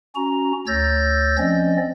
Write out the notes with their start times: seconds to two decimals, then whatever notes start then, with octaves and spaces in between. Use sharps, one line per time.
0.15 C#4 F#4 A#5
0.67 D2 C#5 E6 G6 A6 A#6
1.38 F3 C4 C#4 D5 D#5